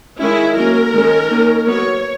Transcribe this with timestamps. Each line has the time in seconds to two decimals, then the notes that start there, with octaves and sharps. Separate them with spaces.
0.19 D#3 G#3 C#4 E4
0.56 F#3 A#3 C#4 A#4
0.93 D#3 G#3 C#4
1.29 D#3 A#3 C#4
1.66 F#3 B3 C#5